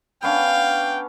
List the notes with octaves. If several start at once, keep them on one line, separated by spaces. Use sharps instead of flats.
B3 C#4 D4 F5 G5